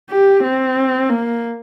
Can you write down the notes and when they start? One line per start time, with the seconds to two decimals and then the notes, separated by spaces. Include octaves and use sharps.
0.10 G4
0.43 C4
1.09 A#3